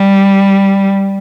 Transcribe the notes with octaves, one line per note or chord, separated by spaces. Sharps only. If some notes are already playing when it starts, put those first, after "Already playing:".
Already playing: G3